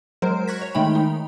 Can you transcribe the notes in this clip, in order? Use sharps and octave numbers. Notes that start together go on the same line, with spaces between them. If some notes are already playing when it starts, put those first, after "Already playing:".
F#3 G#3 A#4 C5
C#6 F#6 G#6 A#6 B6
C#5
D#3 G#3 A3 D#4 G5 B5
D#4